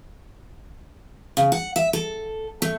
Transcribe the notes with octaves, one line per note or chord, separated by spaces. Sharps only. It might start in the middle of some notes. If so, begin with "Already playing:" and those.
C#3
F#5
E5
A4
A3